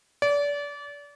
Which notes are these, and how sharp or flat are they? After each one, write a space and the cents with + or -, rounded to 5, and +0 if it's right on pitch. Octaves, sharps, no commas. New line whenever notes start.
D5 -30